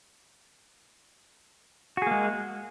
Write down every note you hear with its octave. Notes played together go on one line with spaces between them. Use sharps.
G#3 A#3 F#4 G#4